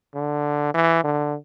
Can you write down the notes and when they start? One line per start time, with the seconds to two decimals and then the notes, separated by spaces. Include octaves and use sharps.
0.15 D3
0.74 E3
1.04 D3